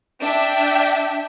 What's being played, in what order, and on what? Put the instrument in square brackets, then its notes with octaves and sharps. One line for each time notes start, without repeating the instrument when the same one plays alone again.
[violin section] D4 E5 G5